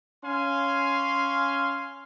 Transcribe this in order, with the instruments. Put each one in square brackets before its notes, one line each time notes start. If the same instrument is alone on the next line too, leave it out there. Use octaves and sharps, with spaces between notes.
[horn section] C#4 F5 G#5 C6